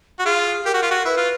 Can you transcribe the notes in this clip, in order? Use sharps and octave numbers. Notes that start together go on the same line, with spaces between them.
F#4
F4 G#4
G4 A#4
F#4
F4
F#4
E4 B4
F4